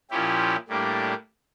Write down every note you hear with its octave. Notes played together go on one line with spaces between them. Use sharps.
A#2 F3 C#4 E4 G4
A2 G3 A#3 D4 G4